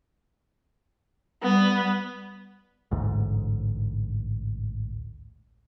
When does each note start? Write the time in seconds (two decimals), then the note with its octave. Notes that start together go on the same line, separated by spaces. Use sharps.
1.43 G3 B3
2.91 A1 D2 G#2